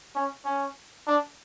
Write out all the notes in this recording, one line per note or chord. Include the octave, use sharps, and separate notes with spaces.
C#4
C#4
D4